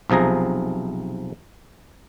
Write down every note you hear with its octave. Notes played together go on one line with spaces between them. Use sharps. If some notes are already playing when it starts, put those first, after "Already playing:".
B1 C3 F3 G#4 A#5